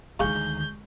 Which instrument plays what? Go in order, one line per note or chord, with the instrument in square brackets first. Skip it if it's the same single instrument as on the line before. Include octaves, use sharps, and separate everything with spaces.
[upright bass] D2 D#3 [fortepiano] G#3 F5 C#6 [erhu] G6